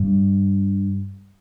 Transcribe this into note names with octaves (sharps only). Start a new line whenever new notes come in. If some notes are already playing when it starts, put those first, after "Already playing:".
Already playing: G2